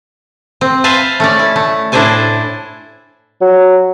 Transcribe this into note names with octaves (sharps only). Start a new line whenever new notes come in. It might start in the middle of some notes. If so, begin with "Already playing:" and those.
C4
B4 C5 E5 F5 G#5 A5
A3 C#4 D5
E4
A3
A2 D4 E4 C5 G#5 A5
F#3